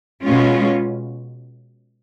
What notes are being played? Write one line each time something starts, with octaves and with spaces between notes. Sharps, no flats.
B2 G#3 C#4 F4